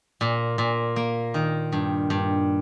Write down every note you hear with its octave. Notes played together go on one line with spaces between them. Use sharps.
A#2
A#2
A#3
D#3
G2
G2